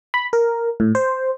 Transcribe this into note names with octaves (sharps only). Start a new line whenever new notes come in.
B5
A#4
A2
C5